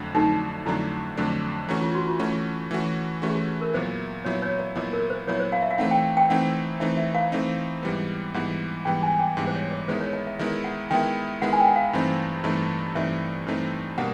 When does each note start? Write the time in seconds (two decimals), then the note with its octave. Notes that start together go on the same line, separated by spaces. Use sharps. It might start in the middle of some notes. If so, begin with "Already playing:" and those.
Already playing: F2 D3 F#3 A3 D4
0.14 F2 D3 F#3 A3 D4 D#4
0.66 F2 D3 F#3 A3 D4 E4
1.17 F2 D3 F#3 A3 D4
1.68 E3 A3 C#4 E4 F#4
1.81 F4
1.95 F#4
2.07 F4
2.20 E3 A3 C#4 F#4
2.71 E3 A3 C#4 F#4
3.22 E3 A3 C#4 F#4 G4
3.30 G#4
3.35 G4
3.61 A#4
3.73 A#2 F#3 B3 E4 C5
4.25 A#2 F#3 B3 E4 C#5
4.42 C#5
4.59 D5
4.76 A#2 F#3 B3 E4 D#5
4.93 A#4
5.10 C5
5.27 A#2 F#3 B3 E4 C#5
5.40 C5
5.52 F5
5.62 E5
5.71 F5
5.78 E3 A3 C4 D#4 F#5
5.91 G5
6.17 G5
6.30 E3 A3 C4 D#4 F#5
6.80 E3 A3 C4 D#4 E5
6.97 E5
7.15 F5
7.32 E3 A3 C4 D#4
7.83 G#2 E3 G3 B3
8.34 G#2 E3 G3 B3 F#5
8.85 G#2 E3 G3 B3 G5
9.03 G#5
9.19 G5
9.37 G#2 E3 G3 B3
9.47 C5
9.55 C#5
9.71 D5
9.88 D#3 G#3 B3 E4 C5
10.01 C#5
10.13 D#5
10.27 E5
10.39 D#3 G#3 B3 E4 E5
10.64 F#5
10.90 D#3 G#3 B3 E4 G5
11.42 D#3 G#3 B3 E4 F#5
11.53 G#5
11.60 G5
11.68 F#5
11.76 F5
11.93 G2 E3 A3 C4 D#4
12.44 G2 E3 A3 C4 D#4
12.95 G2 E3 A3 C4 D#4 E5
13.46 G2 E3 A3 C4 D#4
13.98 B2 G3 A#3 D4 F#5